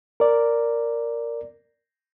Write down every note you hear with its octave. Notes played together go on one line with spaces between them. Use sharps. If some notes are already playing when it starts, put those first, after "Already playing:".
A#4 D5